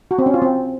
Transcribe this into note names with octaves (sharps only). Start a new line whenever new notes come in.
F#4
C4
C#4
F4
C4